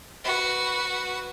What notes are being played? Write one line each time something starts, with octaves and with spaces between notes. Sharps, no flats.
F#4 B4